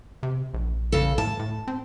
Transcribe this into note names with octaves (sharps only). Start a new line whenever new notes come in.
C3
A#1
C#3 A4
A2 A5
A2
C4